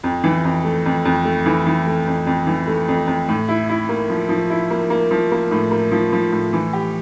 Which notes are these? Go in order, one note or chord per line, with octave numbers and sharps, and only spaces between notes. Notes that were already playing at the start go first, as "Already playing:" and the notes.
F2
E3
F2
A3
F2
F2
A3
E3
E3
A3
F2
F2
E3
A3
F2
F2
A2
E4
E4
A#3
F3
F3
E4
A#3
A#3
F3
A#3
A2
A#3
F3
F3
A2
E3
G4